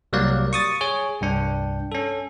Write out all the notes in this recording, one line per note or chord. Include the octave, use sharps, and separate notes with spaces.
C2 F#3 G3 A#3 D5 F5
C#6 D#6 A6
G#4 C#5
C2 G2 D4 G5
C#4 A4